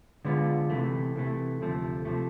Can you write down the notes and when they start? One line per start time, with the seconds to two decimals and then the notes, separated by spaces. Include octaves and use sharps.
0.25 D3 G#3 B3 F4
0.70 C3 E3 A3
1.15 C3 E3 A3
1.61 D2 C3 F3 A3
2.05 C3 F3 A3